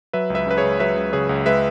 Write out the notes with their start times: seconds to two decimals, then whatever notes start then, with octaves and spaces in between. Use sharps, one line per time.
0.13 F#3 B4 E5
0.30 C#2
0.35 B4 E5
0.47 C#3 B4
0.57 G#4 C#5
0.64 C#2
0.80 F#3 B4 E5
0.96 C#2
1.13 C#3 G#4 C#5
1.29 C#2
1.46 G#3 B4 E5